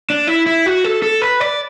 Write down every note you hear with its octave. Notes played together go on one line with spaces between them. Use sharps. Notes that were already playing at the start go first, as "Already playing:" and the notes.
D4
E4
E4
F#4
A4
A4
B4
D5